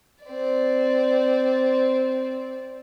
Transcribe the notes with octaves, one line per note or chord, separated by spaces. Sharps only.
C4 D5